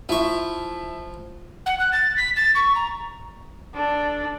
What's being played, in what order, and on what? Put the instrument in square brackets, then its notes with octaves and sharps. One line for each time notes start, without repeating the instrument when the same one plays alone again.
[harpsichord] F3 C#6 [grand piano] E4 E5
[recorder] F#5
F#6
A6
B6
A6
C#6
A#5
[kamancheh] D4 A4